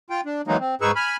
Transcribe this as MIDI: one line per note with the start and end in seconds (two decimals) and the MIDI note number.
0.10 0.21 65
0.10 0.21 79
0.26 0.42 62
0.47 0.57 51
0.47 0.57 52
0.47 0.57 54
0.47 0.57 56
0.47 0.57 58
0.47 0.57 63
0.60 0.75 60
0.81 0.91 44
0.81 0.91 63
0.81 0.91 68
0.81 0.91 71
0.81 0.91 85
0.81 0.91 88
0.96 1.17 80
0.96 1.17 83
0.96 1.17 89